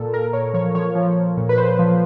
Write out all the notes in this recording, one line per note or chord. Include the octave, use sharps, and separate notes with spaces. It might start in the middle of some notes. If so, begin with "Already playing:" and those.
Already playing: A#2 A4
A#2 A#4
A#2 C#5
F3 C#5
F3 C#5
F3
F3
A#2
B4
A#2 C5
F3